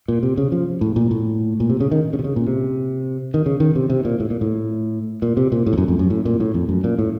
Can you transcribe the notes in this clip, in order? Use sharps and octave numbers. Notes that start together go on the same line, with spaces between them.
A#2
C3
C#3
F3
A2
A#2
A2
A#2
C3
C#3
D#3
C#3
C3
C#3
A#2
C3
D#3
C#3
D#3
C3
C3
A#2
A2
A#2
A2
A#2
C3
A#2
A2
F2
F#2
F2
F#2
A2
A#2
A2
F2
F#2
A#2
A2